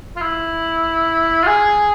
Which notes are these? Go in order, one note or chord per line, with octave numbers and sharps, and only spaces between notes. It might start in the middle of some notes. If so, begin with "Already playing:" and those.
F4
E4
F4
G#4